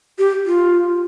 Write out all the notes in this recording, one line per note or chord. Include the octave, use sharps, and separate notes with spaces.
G4
F4